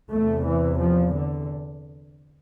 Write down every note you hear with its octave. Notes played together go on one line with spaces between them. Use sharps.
E2 C3 A3
E3
F3
D3